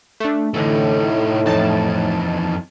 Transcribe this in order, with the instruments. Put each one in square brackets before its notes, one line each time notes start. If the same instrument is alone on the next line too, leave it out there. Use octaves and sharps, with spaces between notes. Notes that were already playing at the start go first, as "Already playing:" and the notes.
[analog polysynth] A3 D4
[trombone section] A2 [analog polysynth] D3 E3 A4 [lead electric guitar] A3 D#4
[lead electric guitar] F2 E3 [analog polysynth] D#4 A5